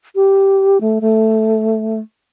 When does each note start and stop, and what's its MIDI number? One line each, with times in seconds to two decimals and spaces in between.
0.15 0.78 67
0.81 0.99 57
1.01 1.99 57